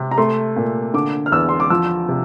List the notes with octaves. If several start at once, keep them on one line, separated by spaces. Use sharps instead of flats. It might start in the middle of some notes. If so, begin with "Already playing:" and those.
Already playing: C3
A#5
A3 C6
A#2
D3 D6
F6
E2 E6
C6
D6
F3 E6
C3